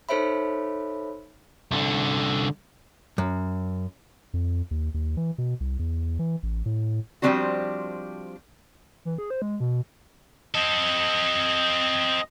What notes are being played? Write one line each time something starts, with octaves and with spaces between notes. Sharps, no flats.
D#4 A4 C5 C#5 E5 B5
C2 D3
F#2
F2
D#2
D#2
E3
B2
C2
E2
E3
A1
A2
F3 G3 G#3 C4 D4 F#4
E3
G#4
C5
G#3
B2
C4 A4 D#5